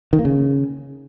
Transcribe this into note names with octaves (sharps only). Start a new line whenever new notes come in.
D#3
A#3
C#3